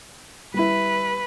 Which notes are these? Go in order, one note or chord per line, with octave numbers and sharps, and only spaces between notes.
G3 E4 B4